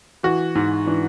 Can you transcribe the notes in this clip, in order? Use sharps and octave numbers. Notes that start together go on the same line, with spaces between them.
E3 F#4
G#2
E3 D4